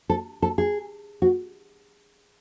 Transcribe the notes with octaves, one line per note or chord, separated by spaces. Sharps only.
A4
A4
G#4
F#4